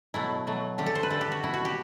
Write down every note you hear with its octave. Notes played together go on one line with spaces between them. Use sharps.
B2 F#3 A3 E4
B2 F#3 A3
D3 A3 G4
A4
C5
B4
D3 A3 A4
G4
F#4
B2 A3 E4
F#4
G4